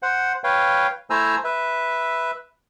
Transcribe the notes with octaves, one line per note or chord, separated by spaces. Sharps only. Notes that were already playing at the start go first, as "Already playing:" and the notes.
C5 F#5
B4 C#5 F5 G5
A3 E4 C5 G#5 A#5 E6
B4 E5